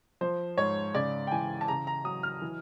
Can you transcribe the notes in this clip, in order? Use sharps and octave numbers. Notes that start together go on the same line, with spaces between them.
F3 C5
G#2 C#5
C#3 D5
G5
E3 G#5
A5
C#3 A#5
A#5
F#3 D#6
F6
E3